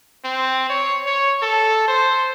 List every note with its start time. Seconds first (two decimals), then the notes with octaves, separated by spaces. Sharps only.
0.25 C4
0.70 C#5
1.07 C#5
1.42 A4
1.88 C5